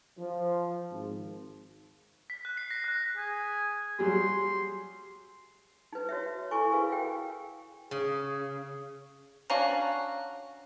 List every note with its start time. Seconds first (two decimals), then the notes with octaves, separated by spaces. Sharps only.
0.19 F3
0.90 G#1
2.30 B6
2.45 F#6
2.57 C7
2.71 A#6
2.84 F#6
3.17 G#4
3.99 F#3 G3 G#4 C6
5.93 D#4 B4
6.09 F#4 C#5 E5
6.51 E4 A4 G#5 C#6 D6
6.72 F#4 G#4 A#4 B4 F5
6.90 F5 G5
7.91 C#3 G#4
9.50 C#4 D4 F#4 F5 A#5